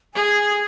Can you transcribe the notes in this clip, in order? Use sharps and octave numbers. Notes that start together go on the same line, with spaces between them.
G#4 G#5